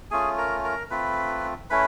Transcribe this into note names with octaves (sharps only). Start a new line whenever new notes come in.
A3 C#4 F4 G#4 G#5
A#4 A#5
A#4 A#5
A3 C4 F4 B4 B5
A3 C#4 E4 B4 B5